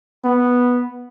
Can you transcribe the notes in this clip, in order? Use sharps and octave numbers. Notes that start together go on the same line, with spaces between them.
B3